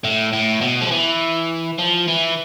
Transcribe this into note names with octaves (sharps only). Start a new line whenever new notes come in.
A2
A2
B2
F3
E3
F3
E3